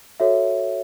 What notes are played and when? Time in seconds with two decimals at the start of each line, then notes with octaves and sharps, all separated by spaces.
0.20 F#4 A4 C#5 E5